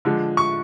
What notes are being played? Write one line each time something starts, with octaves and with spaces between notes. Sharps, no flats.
D3 F3 G#3
C#6